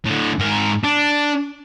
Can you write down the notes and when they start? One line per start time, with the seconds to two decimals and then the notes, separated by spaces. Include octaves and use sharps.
0.05 A2 D3
0.39 G#2 A#4
0.84 D4